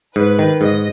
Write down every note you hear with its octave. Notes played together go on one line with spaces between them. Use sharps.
G#2 B4
D#3
G#2 D#5